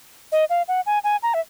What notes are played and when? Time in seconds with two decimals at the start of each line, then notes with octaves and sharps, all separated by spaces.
0.32 D#5
0.50 F5
0.68 F#5
0.86 G#5
1.04 G#5
1.23 A#5
1.34 E5